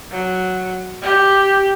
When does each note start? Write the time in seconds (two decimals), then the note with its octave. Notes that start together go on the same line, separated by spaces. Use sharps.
0.11 F#3
1.02 G4